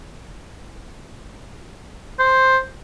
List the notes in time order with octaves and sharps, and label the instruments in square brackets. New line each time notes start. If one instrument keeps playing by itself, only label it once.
[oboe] C5